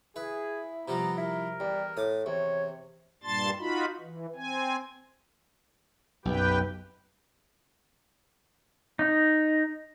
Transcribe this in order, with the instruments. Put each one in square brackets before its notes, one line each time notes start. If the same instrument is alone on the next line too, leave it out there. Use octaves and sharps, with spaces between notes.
[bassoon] E4 [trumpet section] G#4 [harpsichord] B4
[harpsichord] C3 F3 G3 [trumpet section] B3 A#5
[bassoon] E4 [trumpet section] A#4
[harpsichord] E2 [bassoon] G3
[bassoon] A2 [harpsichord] D6 D#6
[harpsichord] E2 [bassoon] C3 [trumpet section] C#5
[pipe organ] G2 A#2 G3 A5 C6 A6
D#4 F4 F#4 B5
E3
C4 G#5
[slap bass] B1 [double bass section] F#2 [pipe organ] G4 B4 G5
[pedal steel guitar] D#4